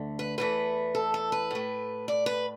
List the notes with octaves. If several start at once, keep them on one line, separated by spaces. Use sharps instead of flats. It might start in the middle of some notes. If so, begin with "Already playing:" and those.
Already playing: D2 D3 A3
B4
E2 E3 A3 B4
A4
A4
B4
A2 A3
D5
B4